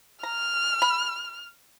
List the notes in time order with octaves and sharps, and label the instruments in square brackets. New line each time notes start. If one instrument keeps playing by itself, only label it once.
[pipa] A#5 [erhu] F6
[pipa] B5